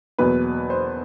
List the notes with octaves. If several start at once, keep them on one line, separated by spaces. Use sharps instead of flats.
E2 B2 F#3 A#3 B4
C5